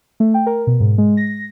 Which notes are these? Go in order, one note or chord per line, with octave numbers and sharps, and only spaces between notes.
A3
G5
A#4
B2
G#2
G#3
A#6